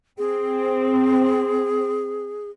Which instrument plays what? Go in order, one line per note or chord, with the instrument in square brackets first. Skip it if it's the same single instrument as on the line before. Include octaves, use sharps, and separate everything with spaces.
[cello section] C4 [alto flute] G#4